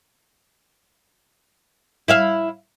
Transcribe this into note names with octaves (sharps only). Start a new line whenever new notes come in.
E4 E5 F5